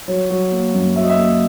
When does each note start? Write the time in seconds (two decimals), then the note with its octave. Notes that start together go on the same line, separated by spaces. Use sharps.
0.08 F#3 C#5
0.30 F#3
0.52 A#3
0.74 F#2
0.96 F#3 E5
1.03 D#5
1.10 E5
1.18 A#3